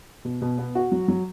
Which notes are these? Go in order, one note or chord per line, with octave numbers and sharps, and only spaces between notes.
B2
B2
B3
F#4
F#3
F#3